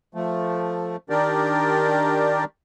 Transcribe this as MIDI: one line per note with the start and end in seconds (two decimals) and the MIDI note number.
0.15 0.96 53
0.15 0.96 57
1.10 2.44 51
1.10 2.44 62
1.10 2.44 67
1.10 2.44 70
1.10 2.44 74